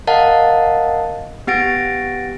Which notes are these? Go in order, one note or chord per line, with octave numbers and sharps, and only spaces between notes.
A#4 D#5 F5 F#5 A5
B3 G4 F#5 A6 A#6 D7